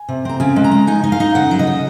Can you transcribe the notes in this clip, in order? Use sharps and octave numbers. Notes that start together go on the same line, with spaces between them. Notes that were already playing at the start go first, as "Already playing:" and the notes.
Already playing: G#5
C3
C4 A#5
C#3 G#5
G#3
A#5
G#3
D#4 G#5
D#4
F5
D#4
C#3 F#5
F#3
D#5
C#3